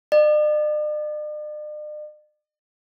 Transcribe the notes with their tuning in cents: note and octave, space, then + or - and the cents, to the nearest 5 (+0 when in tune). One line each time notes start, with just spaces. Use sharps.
D5 +45